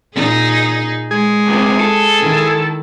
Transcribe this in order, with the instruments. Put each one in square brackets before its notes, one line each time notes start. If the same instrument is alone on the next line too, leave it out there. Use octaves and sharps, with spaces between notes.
[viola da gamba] A#2 D#4 G#4
[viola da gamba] G#3 [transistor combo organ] G#4
[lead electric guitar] C#2 C3
A4
[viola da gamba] D#3 E4